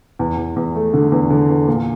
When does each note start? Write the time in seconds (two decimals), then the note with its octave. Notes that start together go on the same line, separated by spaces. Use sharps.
0.19 E2
0.37 E2
0.56 E2
0.75 A3
0.94 D3
1.12 E2
1.30 D3
1.49 E2
1.68 A#2